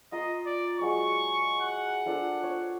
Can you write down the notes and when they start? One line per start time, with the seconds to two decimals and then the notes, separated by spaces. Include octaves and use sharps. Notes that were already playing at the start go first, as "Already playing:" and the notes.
0.12 F4 D#5 A#5 C6
0.46 D5
0.80 F#3 G#3 D5 C#6
1.61 F#5
2.06 D4 F4 A4
2.43 C#5